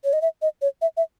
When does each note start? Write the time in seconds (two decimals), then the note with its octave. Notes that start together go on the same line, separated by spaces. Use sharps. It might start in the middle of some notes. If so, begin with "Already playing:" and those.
0.04 C#5
0.13 D#5
0.22 E5
0.42 D#5
0.62 C#5
0.82 E5
0.97 E5